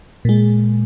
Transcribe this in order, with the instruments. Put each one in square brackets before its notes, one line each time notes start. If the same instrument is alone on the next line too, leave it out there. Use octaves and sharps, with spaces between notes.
[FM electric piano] A#2 G#3